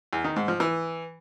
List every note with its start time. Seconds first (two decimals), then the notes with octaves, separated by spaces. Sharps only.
0.13 E2
0.24 D#3
0.36 G#2
0.48 F3
0.60 E3